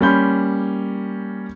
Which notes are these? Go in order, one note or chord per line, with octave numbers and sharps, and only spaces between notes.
G3 A#3 C#4 B5 C6 G6